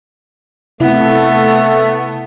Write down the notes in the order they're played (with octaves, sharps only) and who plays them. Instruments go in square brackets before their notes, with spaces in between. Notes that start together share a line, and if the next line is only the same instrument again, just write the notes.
[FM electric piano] C3 E4 [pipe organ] A3 [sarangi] B3